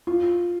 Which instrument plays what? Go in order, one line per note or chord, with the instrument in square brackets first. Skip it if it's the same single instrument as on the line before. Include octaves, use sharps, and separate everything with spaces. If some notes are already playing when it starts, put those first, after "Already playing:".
[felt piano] F4